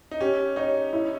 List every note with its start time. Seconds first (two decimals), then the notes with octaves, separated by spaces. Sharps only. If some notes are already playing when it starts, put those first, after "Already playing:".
0.11 D#4
0.20 C#4 G4
0.56 D#4 C#5
0.93 E4